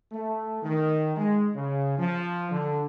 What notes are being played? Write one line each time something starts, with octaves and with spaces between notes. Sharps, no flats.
A3
D#3
G#3
C#3
F3
D3